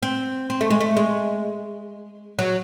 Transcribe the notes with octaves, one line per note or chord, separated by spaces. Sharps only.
C4
C4
A3
G#3
A3
G#3
F#3